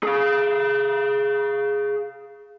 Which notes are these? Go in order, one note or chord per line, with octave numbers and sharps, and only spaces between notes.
G#4 F5